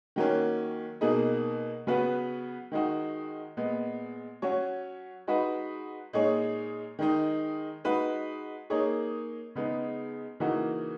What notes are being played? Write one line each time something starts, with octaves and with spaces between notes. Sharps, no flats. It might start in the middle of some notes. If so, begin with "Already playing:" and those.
D#3 F#3 A#3 C#4
B2 A#3 D#4 G#4
C#3 F#3 B3 F#4 B4
D#3 G#3 D#4 F#4
A#2 G#3 B3
F#3 C#4 F#4 C#5
G#3 D#4 F#4 B4
A#2 G#3 D#4 G#4 C#5
D#3 G#3 D#4
G#3 D#4 F#4 B4
A#3 D#4 G#4 C#5
C#3 G#3 B3 D#4
C#3 E3 A#3 D#4 F#4